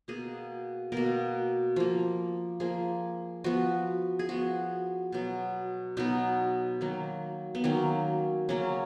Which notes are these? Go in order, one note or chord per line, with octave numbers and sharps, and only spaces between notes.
B2 A#3 G#4
B2 A#3 A#4
F3 A#3
F3 A#3 G#4
F3 B3 F#4
G#4
F3 B3 F#4
B2 F#3 B3
B2 F#3 B3 D#4
D#3 F#3 A#3
B3
D#3 F#3 A#3 C#4
C#3 F#3 A#3 C#4